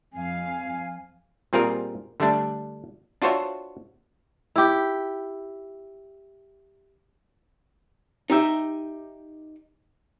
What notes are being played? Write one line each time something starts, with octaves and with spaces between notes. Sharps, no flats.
F2 F5 G#5
A#2 G3 C4 F4 G#4 A#4
D3 G3 A3 D4
D4 F4 F#4 C5 C#5 E5
E4 G4
D#4 G4 E5